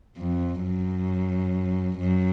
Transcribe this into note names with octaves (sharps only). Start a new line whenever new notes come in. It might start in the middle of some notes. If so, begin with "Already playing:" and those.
F2
F#2
F#2